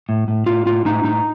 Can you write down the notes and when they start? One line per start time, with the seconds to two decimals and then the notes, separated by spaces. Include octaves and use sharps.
0.09 A2
0.28 A2
0.46 A2 F4
0.66 A2 F4
0.85 A2 D#4
1.04 A2 D#4